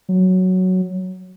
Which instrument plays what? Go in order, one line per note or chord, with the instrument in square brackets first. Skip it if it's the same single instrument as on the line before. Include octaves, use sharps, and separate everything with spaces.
[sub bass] F#3